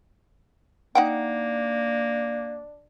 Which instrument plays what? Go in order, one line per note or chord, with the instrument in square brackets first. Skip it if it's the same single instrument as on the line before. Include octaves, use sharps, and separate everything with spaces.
[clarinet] A#3 [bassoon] D4 [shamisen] D#4 F#5 G5